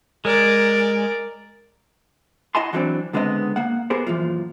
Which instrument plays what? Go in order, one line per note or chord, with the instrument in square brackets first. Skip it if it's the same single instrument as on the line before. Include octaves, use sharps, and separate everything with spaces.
[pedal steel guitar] G#3 [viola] A#4 D5
[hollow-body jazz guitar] E4 D#5 F#5 G#5 A5 C6
E3 F#3 G3 B3 C4 D4
C#2 D3 G#3 B3 C4 D#5
A#3 F#5
B3 G4 G#4 A#4 C5
F#2 A#2 E3 F3